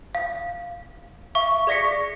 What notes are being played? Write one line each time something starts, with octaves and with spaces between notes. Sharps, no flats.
F5
E5 F5 C#6
G#4 D5 C#6 A#6 B6 C#7